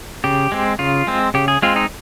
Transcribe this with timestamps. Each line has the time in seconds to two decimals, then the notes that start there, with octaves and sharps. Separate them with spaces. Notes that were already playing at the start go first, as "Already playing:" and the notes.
0.24 C#3 G4
0.52 G#3 C4
0.79 C#3 F4
1.07 G#3 C4
1.34 C#3 G4
1.48 G#4
1.62 G#3 C4 F4
1.76 D#4